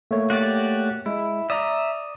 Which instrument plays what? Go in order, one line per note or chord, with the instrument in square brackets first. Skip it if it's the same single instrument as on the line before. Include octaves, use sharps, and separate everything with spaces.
[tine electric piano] A3 A#3 C#5
[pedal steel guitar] F#4 G4 D5
[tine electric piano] G#3 [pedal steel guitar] E4
[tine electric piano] D5 D#6 [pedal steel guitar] E5 A#5